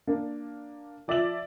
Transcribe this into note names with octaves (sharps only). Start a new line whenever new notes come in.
A#3 D4
F3 D5 E5 E6 F#7